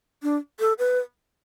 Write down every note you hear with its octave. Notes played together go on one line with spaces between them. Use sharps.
D4
A4
B4